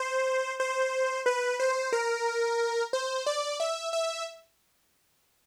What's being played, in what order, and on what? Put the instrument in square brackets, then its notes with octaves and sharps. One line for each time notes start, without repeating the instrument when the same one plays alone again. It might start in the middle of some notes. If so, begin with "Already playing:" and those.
Already playing: [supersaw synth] C5
C5
B4
C5
A#4
C5
D5
E5
E5